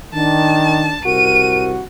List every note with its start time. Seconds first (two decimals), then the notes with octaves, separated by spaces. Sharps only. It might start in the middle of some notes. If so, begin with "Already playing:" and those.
0.14 D#3 D4 A5
1.05 C2 F#4 A#4 D#7